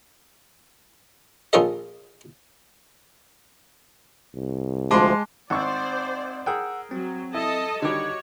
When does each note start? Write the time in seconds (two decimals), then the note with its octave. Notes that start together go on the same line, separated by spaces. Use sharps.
1.53 A#1 C#4 F4 A4 A#4 D#5
4.34 C2
4.91 D2 F3 G#3 A5 C6 D6
5.50 G#1 C4 C5 D5 F#5 C#6 E6
6.46 G#4 A#4 F#5 G5 E6
6.91 F#3 C4
7.35 E4 A4 D#5 A5
7.82 D3 D#3 G3 F#4 C#5 D#5 D6